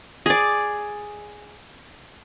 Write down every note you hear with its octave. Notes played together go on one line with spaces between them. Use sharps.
G#4 D5